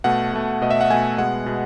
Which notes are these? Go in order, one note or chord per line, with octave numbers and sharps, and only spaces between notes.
B2 A3 F#5
B2 A3
B2 A3 D#5
E5
F#5
B2 A3 G#5
B2 G#3 B3 F#5
B2 G#3